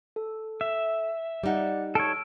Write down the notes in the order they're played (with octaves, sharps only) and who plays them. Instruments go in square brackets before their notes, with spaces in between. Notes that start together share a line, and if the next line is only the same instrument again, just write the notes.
[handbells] A4
[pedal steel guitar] E5
[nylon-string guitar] G3 D#4 [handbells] D5 F#5
[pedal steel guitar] A4 C#5 [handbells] E6 F6 D7